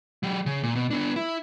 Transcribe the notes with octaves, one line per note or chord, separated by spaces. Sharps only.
F#3 G4
C#3
A#2
B2
B3 D4
E4